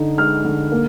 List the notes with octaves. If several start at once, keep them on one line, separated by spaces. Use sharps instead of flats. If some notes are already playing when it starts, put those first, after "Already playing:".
Already playing: D3 D#4
G#3 F6
D3
A#3